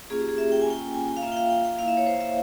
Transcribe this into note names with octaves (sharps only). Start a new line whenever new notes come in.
A#3 C#4 F4 G#4
G4
G#4
E5
G5
G#5
A#3 C#4 F4 G5
G#5
G5
F5
A#3 F4 E5
G5
F5
G5
G5
A#3 E4 F5
E5
C#5
C5
E5